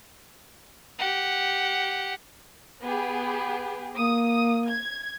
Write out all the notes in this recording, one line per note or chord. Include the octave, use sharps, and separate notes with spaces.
G4 F#5
B3 G4 G#4
A#3 D#6
G#6